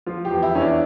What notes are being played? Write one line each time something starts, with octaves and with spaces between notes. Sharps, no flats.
F3 F4
G4
E2
E4
E2 C#4
D4